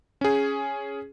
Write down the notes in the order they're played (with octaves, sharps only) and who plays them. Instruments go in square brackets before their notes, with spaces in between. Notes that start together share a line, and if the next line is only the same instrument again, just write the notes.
[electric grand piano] C#4 G#4